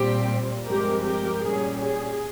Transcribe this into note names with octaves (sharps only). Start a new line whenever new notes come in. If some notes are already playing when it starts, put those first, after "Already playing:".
Already playing: A#2 G3 C4 G4
G2 F3 G#3 C4 G4 A#4
G4 A#4
A#2 G3 C#4 G#4
G#4